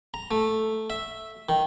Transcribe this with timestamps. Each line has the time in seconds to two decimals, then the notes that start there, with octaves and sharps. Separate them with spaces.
0.14 A#5
0.31 A3
0.90 E5
1.49 D#3